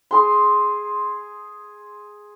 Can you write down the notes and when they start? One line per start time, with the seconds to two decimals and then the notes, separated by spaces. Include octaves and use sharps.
0.11 G#4 C6